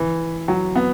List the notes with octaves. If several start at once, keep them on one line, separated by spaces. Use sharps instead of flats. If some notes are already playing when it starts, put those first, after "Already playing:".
Already playing: E3
F#3
B3